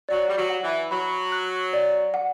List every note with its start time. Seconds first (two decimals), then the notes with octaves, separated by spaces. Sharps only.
0.09 F#3 D5
0.28 G3
0.37 F#3
0.50 F#5
0.63 E3
0.91 F#3 B5
1.32 F#6
1.73 D5
2.14 F#5